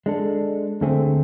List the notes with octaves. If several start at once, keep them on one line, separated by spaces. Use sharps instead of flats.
G#3 D4 A4
D2 D3 A3 C4 G#4